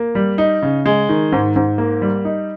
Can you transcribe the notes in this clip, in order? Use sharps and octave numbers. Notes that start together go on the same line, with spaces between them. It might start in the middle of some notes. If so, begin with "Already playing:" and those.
Already playing: A#3
G3
D#4
C#3
G#3
D#3
G#2
G#2
A#3
G3
D#4